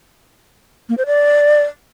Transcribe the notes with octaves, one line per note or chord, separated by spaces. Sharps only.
A#3
C5
D5